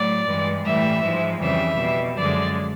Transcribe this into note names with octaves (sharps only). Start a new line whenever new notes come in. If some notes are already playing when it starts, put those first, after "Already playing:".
Already playing: A2 F#3 D5
G2 E3 G#3
A2 E3 G3 E5
G#2 F3 G#3
F2 C#3 E3 G3 E5
B2 G3
F#2 D3 F3 G#3 D5